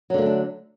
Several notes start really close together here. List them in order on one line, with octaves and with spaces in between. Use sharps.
F#3 D3 A#3 A3 D4